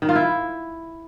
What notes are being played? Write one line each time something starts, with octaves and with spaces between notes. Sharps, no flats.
D#3
F4
E4